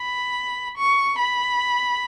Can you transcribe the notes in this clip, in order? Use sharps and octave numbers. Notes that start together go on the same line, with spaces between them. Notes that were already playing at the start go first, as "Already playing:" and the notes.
Already playing: B5
C#6
B5